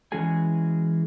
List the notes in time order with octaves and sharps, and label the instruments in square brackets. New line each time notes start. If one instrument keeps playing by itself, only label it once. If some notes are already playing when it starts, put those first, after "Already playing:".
[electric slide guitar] E3 G#3 C#4 F#4 G#4 G#5